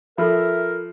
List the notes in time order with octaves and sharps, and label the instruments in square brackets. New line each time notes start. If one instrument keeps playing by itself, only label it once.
[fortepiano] F3 [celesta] F4 A4 B5 [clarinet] A#4 [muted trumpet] E5